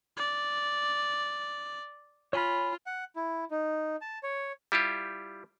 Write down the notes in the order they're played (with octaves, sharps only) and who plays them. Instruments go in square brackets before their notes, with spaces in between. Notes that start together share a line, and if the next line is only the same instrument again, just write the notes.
[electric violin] D5
[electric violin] F4 [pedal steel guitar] C#5 G#5 B5
[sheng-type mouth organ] F#5
E4
D#4
A5
C#5
[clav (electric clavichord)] G3 E4 F4 G4